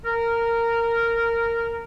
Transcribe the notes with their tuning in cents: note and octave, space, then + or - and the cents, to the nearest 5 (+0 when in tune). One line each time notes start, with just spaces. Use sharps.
A#4 -10